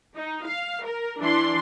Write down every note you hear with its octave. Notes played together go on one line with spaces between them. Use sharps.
D#4
F5
A#4
E3 D4 C6